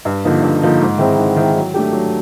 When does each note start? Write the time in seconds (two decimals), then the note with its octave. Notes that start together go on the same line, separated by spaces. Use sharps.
0.05 G2
0.24 D3 F3 A#3 D#4
0.42 G2
0.62 D3 F3 A#3 D#4
0.80 G#2
0.98 D#3 G#3 C4 E4
1.18 G#2
1.36 D#3 G#3 C4 E4
1.55 F#3
1.74 A3 D4 G4
1.93 F#3